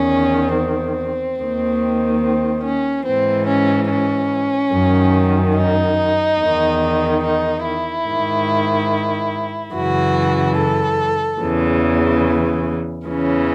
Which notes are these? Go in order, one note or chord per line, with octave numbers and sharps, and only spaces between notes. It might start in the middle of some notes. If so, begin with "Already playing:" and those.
Already playing: E2 D#3 C#4
C4
D#2 D#3
C4
C#4
G#2 E3 C4
C#4
C#4
F#2 D#3
D#4
E2 D#3
D#4
E4
G#2 D#3
F#2 C#3 E3 F#4
A4
E2 C#3 E3
E2 C#3 E3 C#4